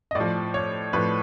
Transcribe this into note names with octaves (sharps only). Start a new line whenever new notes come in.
D#5
A2 F3 D5
C#5
A2 F3 B4